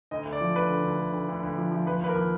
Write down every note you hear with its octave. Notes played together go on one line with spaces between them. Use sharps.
D2 D#5
D2
D5
F3
D2 B4
D3
D2
D2
D2
D2
D2
F3
F3
F3 B4
D#2 B4
A#4
F3